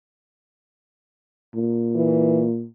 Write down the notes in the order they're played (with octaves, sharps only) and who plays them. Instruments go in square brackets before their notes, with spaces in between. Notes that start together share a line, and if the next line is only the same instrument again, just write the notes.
[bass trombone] A#2
[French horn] E3